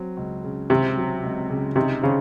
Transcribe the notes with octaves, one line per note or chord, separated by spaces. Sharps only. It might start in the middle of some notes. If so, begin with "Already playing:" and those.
Already playing: F#3 C4
C#2
C#3
C3 C4
F#3
C#2
C#3
C3 D#4
C#3 C4